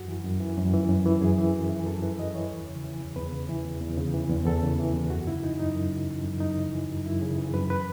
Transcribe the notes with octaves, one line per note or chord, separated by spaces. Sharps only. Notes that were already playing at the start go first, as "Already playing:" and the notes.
Already playing: F#2 F#4
E3
F#2
E3
F#2
E3
F#2
E3
F#2 G#4
E3
F#2
E3
F#2 A4
E3 B4
F#2 D#5
E3 C#5
E2
C#3
E3
E2
E2 B4
C#3
E3
E2
E2
C#3
E3
E2
E2 A4
C#3
E3
E2
F#2 F#4
C#3 E4
E3 D#4
F#2 D#4
F#2
C#3
E3
F#2
F#2 D#4
C#3
E3
F#2
F#2 E4
C#3 G#4
E3
F#2 B4
B4